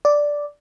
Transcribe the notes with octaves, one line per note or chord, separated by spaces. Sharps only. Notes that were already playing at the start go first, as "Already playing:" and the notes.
D5